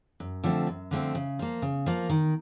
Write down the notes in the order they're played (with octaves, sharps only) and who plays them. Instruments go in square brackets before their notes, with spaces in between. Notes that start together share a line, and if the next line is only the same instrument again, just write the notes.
[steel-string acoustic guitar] F#2
D3 F3 A3 C4
F#2
D3 F3 A3 C4
C#3
F3 A#3
C#3
F3 A#3
D#3